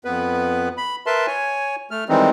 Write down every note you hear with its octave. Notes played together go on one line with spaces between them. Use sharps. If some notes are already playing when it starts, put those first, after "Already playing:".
F2 B3 B4
B5
A#4 B4 E5 A5 C6
C#5 G#5
A3 F6
D#3 E3 G3 G#3 C4 D#4